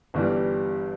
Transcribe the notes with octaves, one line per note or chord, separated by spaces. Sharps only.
G1 G2 E3 G3